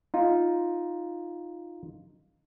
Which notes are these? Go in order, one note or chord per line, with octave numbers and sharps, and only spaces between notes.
D#4 F4